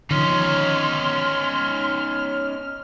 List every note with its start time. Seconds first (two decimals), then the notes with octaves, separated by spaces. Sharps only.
0.11 D3 D#3 F3 C#4 D#4 C6 F6